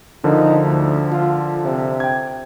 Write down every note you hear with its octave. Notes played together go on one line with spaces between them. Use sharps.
D3 F3 D#4 A#4
D2
F4
C3
G5 G#6